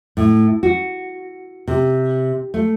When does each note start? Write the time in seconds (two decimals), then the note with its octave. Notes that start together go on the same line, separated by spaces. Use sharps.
0.17 A2
0.63 F#4
1.68 C3
2.54 A3